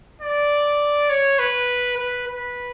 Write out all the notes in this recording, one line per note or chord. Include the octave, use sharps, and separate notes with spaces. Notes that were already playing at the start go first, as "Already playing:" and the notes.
D5
C#5
B4
B4
B4